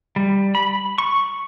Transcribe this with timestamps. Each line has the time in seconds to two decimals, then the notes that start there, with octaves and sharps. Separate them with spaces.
0.16 G3
0.55 B5
0.98 C#6